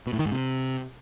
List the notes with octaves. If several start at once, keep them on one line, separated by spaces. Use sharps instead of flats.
B2
A2
D#3
G#2
C3